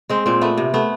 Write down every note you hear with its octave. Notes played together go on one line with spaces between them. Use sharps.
G#3 C4
A#2 C4
A3 B3
C3
A3 B3